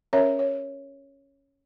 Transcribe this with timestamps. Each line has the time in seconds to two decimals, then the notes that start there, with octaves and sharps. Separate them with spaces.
0.13 C#4 A#4 C#5 E5 A#5
0.39 C#5